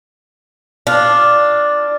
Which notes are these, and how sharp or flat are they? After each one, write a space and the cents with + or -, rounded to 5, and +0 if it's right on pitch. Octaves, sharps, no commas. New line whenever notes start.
D4 +0 F4 +0